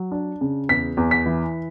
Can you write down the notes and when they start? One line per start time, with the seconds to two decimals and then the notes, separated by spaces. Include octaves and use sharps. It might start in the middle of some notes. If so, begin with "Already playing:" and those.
Already playing: F#3
0.12 D4
0.41 C#3
0.69 E2 B6
0.97 E2
1.11 B6
1.26 E3